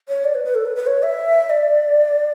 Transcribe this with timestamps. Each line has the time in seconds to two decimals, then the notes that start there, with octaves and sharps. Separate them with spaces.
0.09 C#5
0.24 D5
0.35 B4
0.45 B4
0.55 A4
0.65 B4
0.76 B4
0.87 C#5
1.03 E5
1.50 D5